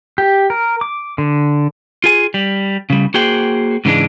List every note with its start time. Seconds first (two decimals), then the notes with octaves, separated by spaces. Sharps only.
0.18 G4
0.50 A#4
0.81 D6
1.18 D3
2.04 F4 G#4 G#5
2.34 G3
2.90 C#3 G3
3.14 A#3 F#4 G#4 C5 G5
3.85 G#2 C#3 E3 G#3 D4